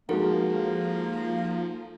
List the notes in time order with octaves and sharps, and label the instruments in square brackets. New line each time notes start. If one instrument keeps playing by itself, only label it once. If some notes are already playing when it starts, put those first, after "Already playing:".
[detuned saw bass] F3 [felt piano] G#3 F#4 A#4 [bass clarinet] A#3 [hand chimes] D#4 A4 F#5